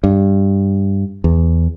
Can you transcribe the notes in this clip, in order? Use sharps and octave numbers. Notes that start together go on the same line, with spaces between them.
G2
E2